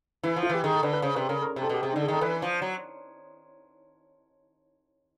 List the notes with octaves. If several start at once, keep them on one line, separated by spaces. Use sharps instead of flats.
E3 E4
F3
F4
E3 G4
D#3 G#4
A4
D3 B4
B4
C#3 C5
C3 B4
C#3 A#4
A#4
C3
A4
B2 G4
C3 G#4
D#4
D3
G#4
D#3 A4
E3 B4
F3
F#3